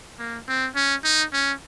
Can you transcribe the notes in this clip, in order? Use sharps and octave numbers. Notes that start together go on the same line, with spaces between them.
A#3
C4
C#4
D#4
C#4